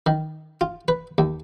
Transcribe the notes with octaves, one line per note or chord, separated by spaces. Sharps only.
D#3
F4
B4
D#2